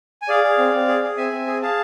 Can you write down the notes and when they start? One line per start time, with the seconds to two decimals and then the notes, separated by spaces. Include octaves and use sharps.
0.22 G#5
0.28 G#4 D5 F5
0.44 G#4
0.58 C4
0.74 C4
0.88 G#4
1.03 G#4
1.17 C4 E5 G#5
1.33 C4
1.47 G#4
1.62 G#4 F5 A5